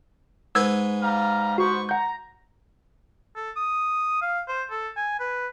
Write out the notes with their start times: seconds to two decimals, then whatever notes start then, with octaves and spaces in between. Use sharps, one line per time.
0.55 G#2 B4 G#5 E6 G#6
1.01 G3 F5 A#5
1.58 B3 F#4 C5 C#6
1.89 F#5 A#5 G6
3.36 A4
3.56 D#6
4.22 F5
4.48 C5
4.71 A4
4.97 G#5
5.20 B4